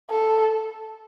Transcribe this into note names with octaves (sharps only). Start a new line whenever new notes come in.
A4